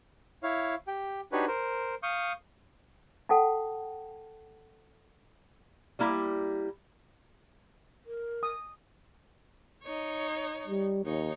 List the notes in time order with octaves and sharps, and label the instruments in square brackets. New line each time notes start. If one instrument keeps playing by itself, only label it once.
[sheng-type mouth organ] E4 C#5 F5
G4 G5
D4 D#4 F#4 G4 B4 C#5
A#4 C5
F5 C#6 D#6 G6
[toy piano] A4 F#5 G5 A5
[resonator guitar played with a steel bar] G3 A#3 E4 F4 G4
[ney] A#4
[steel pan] D#6
[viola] D#4 C#5
[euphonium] G3
[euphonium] D#2 [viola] D#4 C#5